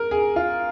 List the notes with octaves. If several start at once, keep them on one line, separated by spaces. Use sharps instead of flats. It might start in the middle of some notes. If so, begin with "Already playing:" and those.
Already playing: A#4
G#4
F4